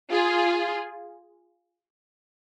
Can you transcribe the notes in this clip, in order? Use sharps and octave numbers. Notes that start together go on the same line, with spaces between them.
F4 G#4